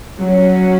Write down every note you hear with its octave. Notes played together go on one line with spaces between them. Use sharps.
F#3 C#4 F#4